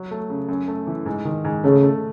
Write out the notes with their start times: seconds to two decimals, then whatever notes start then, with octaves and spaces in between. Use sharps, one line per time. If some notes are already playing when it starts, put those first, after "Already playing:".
Already playing: F#3
0.11 A3
0.30 C#3
0.48 F#2
0.68 A3
0.87 E3
1.06 G#2
1.25 D#3
1.45 G#2
1.64 C#3 A3
1.83 A3